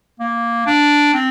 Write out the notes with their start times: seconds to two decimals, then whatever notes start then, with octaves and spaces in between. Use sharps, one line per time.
0.20 A#3
0.66 D4
1.14 C4